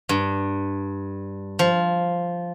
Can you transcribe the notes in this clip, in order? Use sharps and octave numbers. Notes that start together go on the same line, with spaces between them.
G2
F3